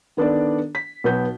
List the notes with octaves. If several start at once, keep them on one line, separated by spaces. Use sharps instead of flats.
D#3 B3 D4 A4 D5
B6
B1 B3 G6